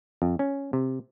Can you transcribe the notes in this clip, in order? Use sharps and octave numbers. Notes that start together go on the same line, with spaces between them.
F2
C#4
C3